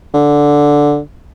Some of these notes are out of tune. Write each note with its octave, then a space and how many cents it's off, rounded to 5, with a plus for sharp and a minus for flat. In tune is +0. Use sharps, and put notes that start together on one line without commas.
D3 -5